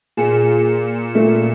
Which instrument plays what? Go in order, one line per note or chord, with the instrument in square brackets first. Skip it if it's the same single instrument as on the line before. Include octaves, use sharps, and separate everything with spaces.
[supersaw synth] A#2 C#7 E7 [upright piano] G#4
[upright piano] A3